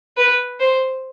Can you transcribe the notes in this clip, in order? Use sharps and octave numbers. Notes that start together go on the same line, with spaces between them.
B4
C5